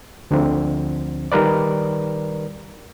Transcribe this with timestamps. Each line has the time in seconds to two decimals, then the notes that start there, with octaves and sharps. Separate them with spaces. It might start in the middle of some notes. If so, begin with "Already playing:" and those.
0.31 D2 D3 F3 C4
1.32 D#3 G3 A#4 B4 D5